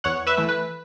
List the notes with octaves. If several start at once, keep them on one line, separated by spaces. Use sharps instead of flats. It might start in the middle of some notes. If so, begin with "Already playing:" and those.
E2 C#5 F#5
B4 E5
E3 A3
B4